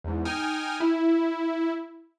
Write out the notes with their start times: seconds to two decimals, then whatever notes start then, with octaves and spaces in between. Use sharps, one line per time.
0.04 E2 G#2
0.25 D#4 G5 G#5 D#6 F6
0.80 E4